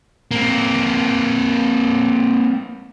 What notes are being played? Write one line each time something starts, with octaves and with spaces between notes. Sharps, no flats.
A#3 C4